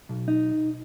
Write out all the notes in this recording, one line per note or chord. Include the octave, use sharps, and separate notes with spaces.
B1
D#4